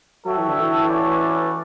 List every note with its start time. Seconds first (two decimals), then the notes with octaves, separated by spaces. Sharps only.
0.25 F#3 F#4 A4 C#5 E5 G5
0.37 E3
0.49 D3
0.61 E3
0.88 A3 C#4 F#4 B4 D5